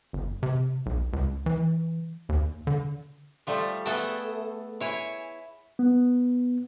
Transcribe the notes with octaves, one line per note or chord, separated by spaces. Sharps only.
G1
C3
B1
C#2
E3
D#2
D3
F3 G3 A3
A3 B3 G#4 A4 G5
E4 C#5 G#5
B3